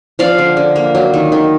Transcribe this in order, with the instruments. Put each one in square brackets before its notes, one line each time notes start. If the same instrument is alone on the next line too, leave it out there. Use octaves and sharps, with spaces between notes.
[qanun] F3 D5 F5
D3
D3
A#3
F#3
D#3
D#3